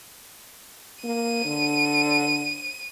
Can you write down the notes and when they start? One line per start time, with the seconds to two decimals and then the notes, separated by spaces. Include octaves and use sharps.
1.04 A#3 D#7
1.45 D3